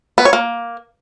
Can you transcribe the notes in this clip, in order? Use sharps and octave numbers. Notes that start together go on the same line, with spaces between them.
B3
C#5
A#3